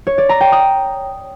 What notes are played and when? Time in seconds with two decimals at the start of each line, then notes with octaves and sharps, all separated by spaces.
0.07 C#5
0.18 D5
0.29 A#5
0.41 G5
0.52 D#6